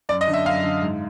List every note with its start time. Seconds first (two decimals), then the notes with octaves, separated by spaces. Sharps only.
0.09 F#2 D5
0.21 D#5
0.28 D3
0.33 E5
0.46 F#2 F5
0.64 D3
0.82 G#2